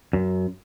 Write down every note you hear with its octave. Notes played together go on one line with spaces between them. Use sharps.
F#2